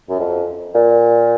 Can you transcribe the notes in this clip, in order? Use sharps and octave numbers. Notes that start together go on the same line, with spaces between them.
F#2
F2
A#2